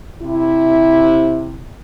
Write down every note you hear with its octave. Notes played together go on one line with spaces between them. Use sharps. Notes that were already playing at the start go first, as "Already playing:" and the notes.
C3 E4